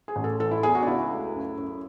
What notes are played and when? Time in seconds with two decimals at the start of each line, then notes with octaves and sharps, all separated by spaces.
0.08 G#4
0.16 A1
0.24 A4
0.40 E3 A4
0.51 E4
0.63 E2 G#4
0.75 F#4
0.83 D4
0.87 C#2 E4
1.11 A3
1.34 F#2
1.58 F#2